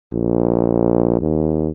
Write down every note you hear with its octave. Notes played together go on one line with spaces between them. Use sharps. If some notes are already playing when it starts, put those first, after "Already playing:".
A#1
D#2